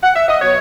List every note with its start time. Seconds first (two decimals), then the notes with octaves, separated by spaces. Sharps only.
0.03 F#5
0.15 E5
0.28 D#5
0.41 B2 F#3 B3 C#5